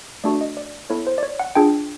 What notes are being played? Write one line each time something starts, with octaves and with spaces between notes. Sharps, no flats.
A3 D4 F#4 A4 D5
D#5
D5
B3 E4 A4 C#5
C5
D5
C#5
F#5
D4 F4 G#4 G5